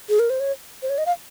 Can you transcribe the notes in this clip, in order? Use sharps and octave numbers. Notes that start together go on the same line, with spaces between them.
G#4
A#4
C5
C#5
C5
C#5
D#5
F5